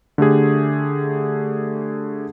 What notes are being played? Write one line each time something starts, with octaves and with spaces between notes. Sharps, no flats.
D3 A3 G4 G#4